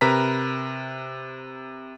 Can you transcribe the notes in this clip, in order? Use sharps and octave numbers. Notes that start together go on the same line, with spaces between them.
C3 A#4 B4 A#5 B6